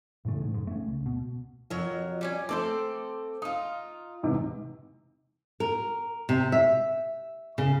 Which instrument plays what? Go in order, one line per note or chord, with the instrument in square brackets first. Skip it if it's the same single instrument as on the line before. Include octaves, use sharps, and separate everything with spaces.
[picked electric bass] A2 C#3 E3 A3
G#2
F1 G#2
A3 C#4
C#2
B2
[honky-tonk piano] F2 [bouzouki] F#3 A#4
[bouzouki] G3 C4 C#4
[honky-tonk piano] A3 D6 [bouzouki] C4 A4 C5
[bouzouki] D#4 F4 [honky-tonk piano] D#6
[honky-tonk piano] E2 G#2 C3
[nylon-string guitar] A#4
C3
E5
C#3